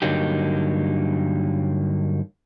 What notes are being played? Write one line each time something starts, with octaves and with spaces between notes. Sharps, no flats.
G2 D3 F#3 A#3 D#4 G4